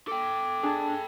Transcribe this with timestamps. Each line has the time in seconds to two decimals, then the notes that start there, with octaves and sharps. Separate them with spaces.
0.08 A4 G5 D6
0.63 D4 G#4 A5